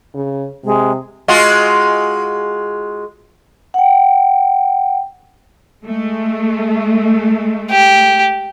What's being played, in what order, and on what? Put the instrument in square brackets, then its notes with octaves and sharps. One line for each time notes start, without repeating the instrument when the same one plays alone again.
[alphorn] C#3
[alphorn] C3 [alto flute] G#3
[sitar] G#3 F4 F#4
[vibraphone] F#5 G5
[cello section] G#3 A3
[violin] G4